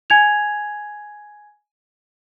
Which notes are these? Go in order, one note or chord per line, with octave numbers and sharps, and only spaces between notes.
G#5 G#6 F7